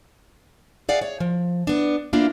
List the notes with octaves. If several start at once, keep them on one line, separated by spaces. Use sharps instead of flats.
G#4 D5 F5 F#5
C#5
F3
B3 D4
A#3 B3 D4 E4 F4